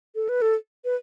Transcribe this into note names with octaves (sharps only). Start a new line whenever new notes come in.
A4
B4
A4
B4